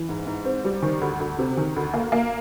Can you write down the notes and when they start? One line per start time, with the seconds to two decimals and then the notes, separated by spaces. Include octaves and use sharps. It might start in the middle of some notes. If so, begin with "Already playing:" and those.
Already playing: E3
0.09 G#2
0.27 G#2
0.45 C4
0.64 G3
0.82 D#3
1.01 D2
1.20 D2
1.38 C3
1.57 D#3
1.76 D2
1.93 A#3
2.12 A#3